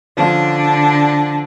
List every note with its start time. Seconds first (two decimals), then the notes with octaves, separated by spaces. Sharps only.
0.17 D3 F3 C#4 D4 F4